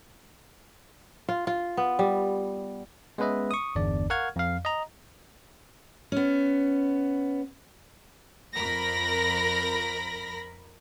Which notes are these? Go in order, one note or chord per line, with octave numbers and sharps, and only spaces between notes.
F4
F4
B3
G3
G#3 B3 C#4 B4 D#5 E5
C#6 D#6
G1 E2 D4 D5
A#4 F5 F#5 C#6 F6 G#6
F2 F5
D#5 A#5
B3 C#4
F2 A#4 B5 A#6